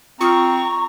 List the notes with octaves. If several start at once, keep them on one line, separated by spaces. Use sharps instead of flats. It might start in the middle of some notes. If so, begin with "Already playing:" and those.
C4 F4 A#5 C#6 D#6 F6